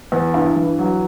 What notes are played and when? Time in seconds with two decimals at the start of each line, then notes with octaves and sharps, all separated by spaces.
0.12 E2
0.34 G2 E4
0.56 E3
0.79 F#3